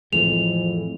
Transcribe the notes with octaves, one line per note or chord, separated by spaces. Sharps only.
F2 A2 E3 G#3 F7